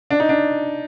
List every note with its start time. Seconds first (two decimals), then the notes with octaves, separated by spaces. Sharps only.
0.11 D4
0.20 D#4
0.29 D4